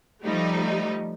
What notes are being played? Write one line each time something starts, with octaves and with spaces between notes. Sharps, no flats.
F3 G3 A3 D#4